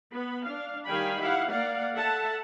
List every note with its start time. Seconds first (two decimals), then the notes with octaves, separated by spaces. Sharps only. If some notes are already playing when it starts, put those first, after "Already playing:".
0.13 B3 B5
0.45 D4 F5
0.87 D#3 G3 F5 G5 G#5 B5
1.21 E4 G4 F5 F#5
1.51 A#3 D5 F5 F#5
1.94 A4 E5 F#5 A5